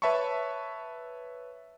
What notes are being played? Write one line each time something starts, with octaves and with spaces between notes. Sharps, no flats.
B4 C#5 E5 A5 B5 C#6